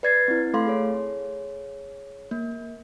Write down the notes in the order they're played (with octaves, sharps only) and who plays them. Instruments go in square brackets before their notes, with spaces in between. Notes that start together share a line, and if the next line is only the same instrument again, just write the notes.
[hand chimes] B4 D5 G#6 A6 C7
C4 E4
A3 A4 F5 C6
G#4 C#5
A#3